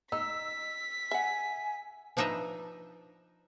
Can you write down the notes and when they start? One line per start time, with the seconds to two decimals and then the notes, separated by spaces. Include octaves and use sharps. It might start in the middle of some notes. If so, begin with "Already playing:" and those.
0.12 D#4 E6 B6
1.11 E5 F#5 G#5
2.17 F3 D4 D#4 B4 E5